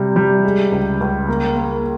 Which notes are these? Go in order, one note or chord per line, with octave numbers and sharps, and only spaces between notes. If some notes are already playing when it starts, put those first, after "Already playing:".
Already playing: C3 G3
G3
G#3
C#2
C#2
A#3
A#3